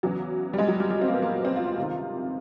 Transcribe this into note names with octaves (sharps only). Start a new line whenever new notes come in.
E2 C#3 E3 F#3
G3
G#3
F#3
G3
G3
C4
A#3
B3
A#3
C4
F4
F4
C#2 C3 D#3